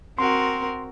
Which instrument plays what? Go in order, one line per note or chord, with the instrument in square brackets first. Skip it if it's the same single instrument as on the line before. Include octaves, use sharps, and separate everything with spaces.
[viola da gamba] C4 F#4 A#4 [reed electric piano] C6